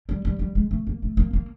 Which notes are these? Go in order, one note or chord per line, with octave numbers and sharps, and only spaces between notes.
G3
G3
G3
G#3
A3
A#3
A3
A#3
A#3